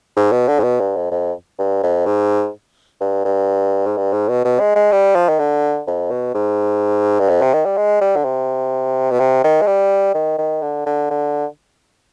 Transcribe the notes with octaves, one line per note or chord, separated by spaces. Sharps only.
G#2
B2
D3
G#2
B2
G2
F2
F2
G2
F2
G#2
G2
G2
G#2
G2
G#2
B2
B2
G#3
G#3
G3
F3
D#3
D3
F2
B2
G#2
G2
F2
C3
D#3
G3
G#3
G3
D3
C3
B2
C3
D#3
G#3
G3
D#3
D#3
D3
D3
D3